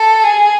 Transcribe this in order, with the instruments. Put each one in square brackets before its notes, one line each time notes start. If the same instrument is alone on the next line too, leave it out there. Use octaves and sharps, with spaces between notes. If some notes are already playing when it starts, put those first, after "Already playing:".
Already playing: [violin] A4
G#4